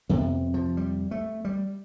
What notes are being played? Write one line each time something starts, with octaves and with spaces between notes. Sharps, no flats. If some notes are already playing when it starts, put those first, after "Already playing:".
F2 C3 B3
F3
G3
A3
G3